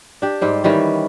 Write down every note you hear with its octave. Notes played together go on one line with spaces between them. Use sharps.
D4 G4
G#2 G3 C5
D#3 E3 G3 C#4